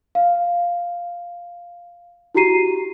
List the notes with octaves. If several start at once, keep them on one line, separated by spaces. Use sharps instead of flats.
F5
E4 F#4 G4 A#5 C7 D#7